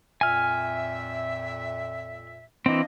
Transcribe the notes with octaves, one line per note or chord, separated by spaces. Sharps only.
F2 A#2 E5 G#5 F6
E3 A#3 C4 D4 D#5